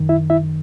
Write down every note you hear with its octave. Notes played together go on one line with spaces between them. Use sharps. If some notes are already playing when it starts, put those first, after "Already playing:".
Already playing: F#2 D#3
E4 E5
E4 E5